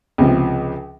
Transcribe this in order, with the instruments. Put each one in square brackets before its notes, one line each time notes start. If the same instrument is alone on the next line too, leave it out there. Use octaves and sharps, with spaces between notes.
[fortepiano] C#2 C3 F3